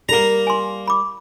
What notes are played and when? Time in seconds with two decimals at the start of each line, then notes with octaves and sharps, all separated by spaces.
0.09 G3 A#3 A#4 A#5
0.47 G#5 C6
0.88 B5 D6